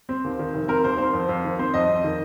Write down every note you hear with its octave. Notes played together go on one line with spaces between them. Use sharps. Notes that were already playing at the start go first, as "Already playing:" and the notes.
C4
D#2
D#3
F1
C4 A#4
D#2 C5
C4 C5
F2
F2
D#3
C4 C5
F2 D#5
F2
D#3